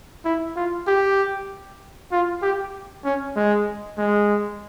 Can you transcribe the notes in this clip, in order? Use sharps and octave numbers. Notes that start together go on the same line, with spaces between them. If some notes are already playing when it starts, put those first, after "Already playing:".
E4
F4
G4
F4
G4
C#4
G#3
G#3